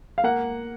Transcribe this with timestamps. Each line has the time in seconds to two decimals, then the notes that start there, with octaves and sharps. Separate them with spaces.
0.18 F5
0.24 A#3 F#5